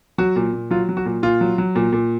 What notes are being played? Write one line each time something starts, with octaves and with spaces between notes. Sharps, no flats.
F#3 F#4
A#2
A#2
F#3 F4
F#3
F#4
A#2
A#2 F4
F#3
F#3
A#2
A#2